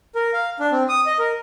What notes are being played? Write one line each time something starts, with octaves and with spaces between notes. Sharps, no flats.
A#4
F5
D4
C4
D#6
D#5
A#4